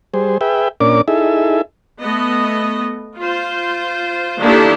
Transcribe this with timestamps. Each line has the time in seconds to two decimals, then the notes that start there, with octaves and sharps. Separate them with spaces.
0.14 G3 G#4 C5
0.41 G#4 B4 E5 G5
0.81 A#2 C#4 D4 A#4 D5 D6
1.08 D#4 E4 G#4 A4 E5
2.00 A3 B3 D#5
3.18 F4 C5
4.40 D#3 A#3 D4 E4 G4 A4